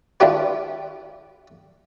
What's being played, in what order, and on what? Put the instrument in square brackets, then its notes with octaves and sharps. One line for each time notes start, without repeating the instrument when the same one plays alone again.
[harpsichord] D4 E4 F4 G4 B4